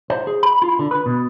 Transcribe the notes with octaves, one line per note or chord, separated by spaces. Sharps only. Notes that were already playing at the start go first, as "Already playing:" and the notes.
C5
G#4
B5
F4
D3
B4
B2